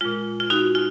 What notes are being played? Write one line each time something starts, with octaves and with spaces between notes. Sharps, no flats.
A#2 G#3 F4
F4
D#4 F#4
F4